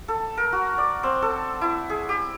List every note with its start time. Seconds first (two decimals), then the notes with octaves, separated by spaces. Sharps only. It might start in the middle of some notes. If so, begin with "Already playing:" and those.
0.08 A4
0.37 A#4
0.52 F#4
0.78 D5
1.03 C4
1.22 A4
1.61 E4
1.89 G#4
2.09 G4